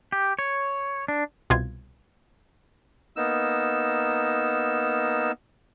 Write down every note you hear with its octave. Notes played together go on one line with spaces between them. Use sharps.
G4
C#5
D4
C2 B2 F4 G#6
A#3 B3 D#4 E6